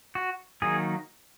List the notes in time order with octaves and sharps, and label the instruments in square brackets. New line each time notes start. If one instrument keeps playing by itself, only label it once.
[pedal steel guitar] F#4
D#3 F#3 A#3 D#4 G#4